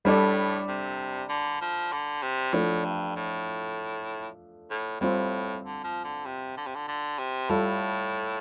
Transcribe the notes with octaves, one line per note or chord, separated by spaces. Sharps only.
A2 G3 D4 A4 D5
C3
D3
F3
D3
C3
A2 F3 A3 D4
G2
A2
A2
A2 G3 C4 F4 C5
D3
F3
D3
C3
D3
C3
D3
D3
C3
A2 G3 F4 A4